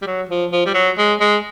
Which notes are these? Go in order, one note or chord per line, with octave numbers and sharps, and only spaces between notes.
G3
F#3
F3
F3
G3
F#3
G#3
G#3